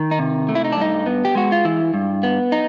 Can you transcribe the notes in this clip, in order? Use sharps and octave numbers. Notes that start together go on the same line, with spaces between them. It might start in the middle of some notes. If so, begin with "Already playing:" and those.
Already playing: D#3
D#4
C3
A3
E4
D#4
D4
G2 D#4
B3
G4
G#3 F#4
F4
E3 E4
G2
B3
D#4